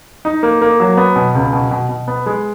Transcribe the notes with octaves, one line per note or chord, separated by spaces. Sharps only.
D#4
A#3
A#3
F#3
B3
B2
C#2
B2
B2
B2
B3
G#3